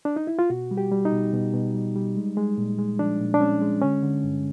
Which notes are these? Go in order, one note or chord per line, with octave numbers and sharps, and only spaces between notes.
D4
D#4
E4
F4
B2 F#4
G3
G4
G3
D#4
B2
B2
B2
G3
G3
G#3
G#3
A#2
G#3
F3 D4
A#2
D4
G#3 C#4
G#3
D3 C#4
D3
G2